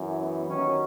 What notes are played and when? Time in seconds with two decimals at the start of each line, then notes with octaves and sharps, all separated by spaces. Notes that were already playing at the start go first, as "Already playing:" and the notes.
Already playing: F#2 E3
0.19 B3
0.48 D#2 D#3 F#3 C#4